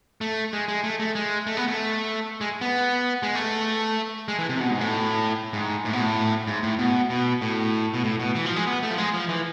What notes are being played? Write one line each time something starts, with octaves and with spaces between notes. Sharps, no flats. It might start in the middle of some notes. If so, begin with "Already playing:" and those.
A3
G#3
G#3
A3
A3
G#3
A3
B3
A3
G#3
B3
G#3
A3
G#3
E3
C3
B2
G#2
A2
G#2
A2
B2
A2
G#2
A2
B2
B2
A2
B2
A2
B2
E3
F3
G#3
B3
A3
F3
G#3
F3
E3